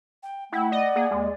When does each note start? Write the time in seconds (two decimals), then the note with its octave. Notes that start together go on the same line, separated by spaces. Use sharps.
0.23 G5
0.52 A3 E4 F#5 G5
0.72 D5 D#5
0.96 A#3 G#4
1.11 D#2 G#3